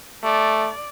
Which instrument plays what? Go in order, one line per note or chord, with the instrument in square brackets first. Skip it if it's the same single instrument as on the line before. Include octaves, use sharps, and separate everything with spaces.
[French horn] A3 [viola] D5